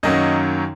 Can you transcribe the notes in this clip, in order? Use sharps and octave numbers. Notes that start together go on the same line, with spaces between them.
F#2 D#3 F#3 A#3 C#4 D#5